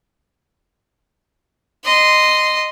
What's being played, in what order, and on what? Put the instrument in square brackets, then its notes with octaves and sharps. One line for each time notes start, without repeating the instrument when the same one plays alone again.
[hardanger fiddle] D#5 C6